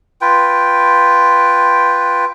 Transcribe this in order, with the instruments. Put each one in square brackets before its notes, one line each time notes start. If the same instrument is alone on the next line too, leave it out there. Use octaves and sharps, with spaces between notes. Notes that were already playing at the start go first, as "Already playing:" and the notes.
[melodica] F4 B4 G5